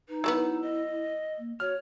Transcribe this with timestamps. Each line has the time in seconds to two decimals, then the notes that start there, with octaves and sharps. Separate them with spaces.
0.08 D#4 B4
0.24 F#3 A3 B3 E4 E6
0.61 D#5
1.39 A#3
1.60 F#4 C#5 F6